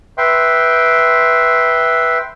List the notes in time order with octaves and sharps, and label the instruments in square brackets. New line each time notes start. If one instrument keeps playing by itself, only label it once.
[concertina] B4 E5 G5 C6